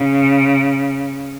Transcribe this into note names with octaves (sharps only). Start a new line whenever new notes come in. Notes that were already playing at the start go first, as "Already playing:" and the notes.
Already playing: C#3